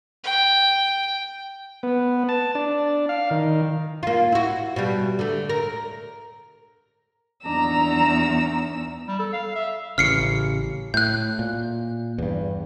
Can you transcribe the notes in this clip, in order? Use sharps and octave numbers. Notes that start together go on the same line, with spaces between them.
G5
B3
A5
D4
F5
D#3
A#3 F4
E4 F#4
B2 G3
D3 A3
A#4
E2 D4 D#4 A#5 E6
G3
A4
F5
E5
A1 C#3 F6 C7 C#7
A2 F#6 G6
A#2
E2 G2